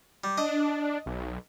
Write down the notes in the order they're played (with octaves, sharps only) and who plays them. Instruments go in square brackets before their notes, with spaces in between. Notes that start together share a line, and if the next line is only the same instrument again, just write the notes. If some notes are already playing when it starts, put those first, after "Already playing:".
[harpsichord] G3
[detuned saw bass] D4 [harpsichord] D#5
[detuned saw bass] B1